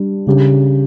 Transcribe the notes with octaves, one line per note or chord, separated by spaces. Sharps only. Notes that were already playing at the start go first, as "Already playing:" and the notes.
Already playing: G3 D4
C#3 G3 D4 G4